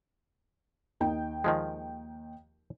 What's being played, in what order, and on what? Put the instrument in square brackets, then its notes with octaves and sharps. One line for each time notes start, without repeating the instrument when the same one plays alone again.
[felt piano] D#2 D#4 G5
[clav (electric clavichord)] D#3 F3 G#3